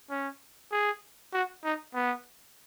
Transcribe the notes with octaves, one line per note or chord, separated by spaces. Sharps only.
C#4
G#4
F#4
D#4
B3